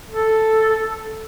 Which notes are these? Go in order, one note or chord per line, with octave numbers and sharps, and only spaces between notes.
A4